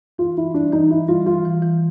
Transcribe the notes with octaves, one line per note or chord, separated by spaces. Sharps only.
E3 F4
E3 E4
G3 D4
E3 D#4
E3 E4
G3 F4
E3 F4
E3
E3